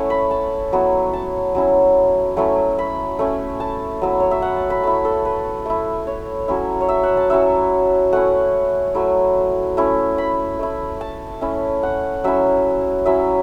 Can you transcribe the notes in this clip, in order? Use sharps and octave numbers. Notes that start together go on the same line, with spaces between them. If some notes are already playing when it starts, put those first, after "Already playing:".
Already playing: A3 C#4 E4 C#5 E5 F#5 A5
B5
A5
F#3 B3 E4
A5
F#3 C#4 E4
F#3 A3 C#4 E4
B5
A3 C#4 E4
A5
F#3 B3 E4
C#5
E5
F#5
A5
B5
A3 E4 A5
A4
B4
A3 E4
C#5
F#3 C#4 E4
C#5
E5
F#5
A5
F#3 C#4 E4 E5
A3 C#4 E4 F#5
F#3 A3 E4
A3 C#4 E4
B5
A3 E4
A5
A3 C#4 E4
F#5
F#3 C#4 E4 E5
F#3 C#4 E4 E5